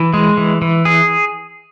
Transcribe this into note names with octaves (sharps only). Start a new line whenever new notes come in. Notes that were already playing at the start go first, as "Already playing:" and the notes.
Already playing: E3
G#3
E3
E3
G#4